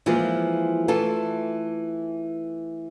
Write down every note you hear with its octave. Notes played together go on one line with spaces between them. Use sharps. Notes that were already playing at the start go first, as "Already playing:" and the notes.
E3 F3 G#3 A#3 F4
E3 A3 F4 A4